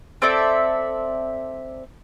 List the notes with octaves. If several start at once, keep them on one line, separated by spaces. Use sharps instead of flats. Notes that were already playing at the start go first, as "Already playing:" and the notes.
C4 A4 D5 E5